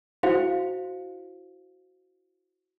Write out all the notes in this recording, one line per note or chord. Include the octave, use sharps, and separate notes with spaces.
E4 F#4 C5 F5 G5